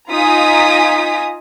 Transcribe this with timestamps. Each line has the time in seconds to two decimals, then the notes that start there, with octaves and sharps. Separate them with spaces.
0.11 D#4 F4 G#5 A#5 D#6 B6